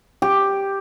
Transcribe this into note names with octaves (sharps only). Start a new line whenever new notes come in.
G4